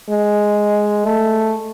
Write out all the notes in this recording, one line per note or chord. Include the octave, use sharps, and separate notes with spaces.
G#3
A3